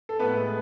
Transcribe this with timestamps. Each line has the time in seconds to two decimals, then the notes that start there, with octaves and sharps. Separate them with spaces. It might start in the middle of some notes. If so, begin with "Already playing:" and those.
0.09 A4
0.19 A2 B3 B4
0.37 G#3